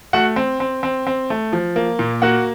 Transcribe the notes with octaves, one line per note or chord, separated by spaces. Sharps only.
A3 F#4 F#5
C4
C4
C4
C4
A3
F3
A#3
A#2
A#3 F#4 F#5